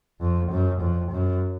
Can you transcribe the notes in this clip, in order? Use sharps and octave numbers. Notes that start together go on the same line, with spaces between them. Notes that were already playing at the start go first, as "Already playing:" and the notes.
F2
F#2
F2
F#2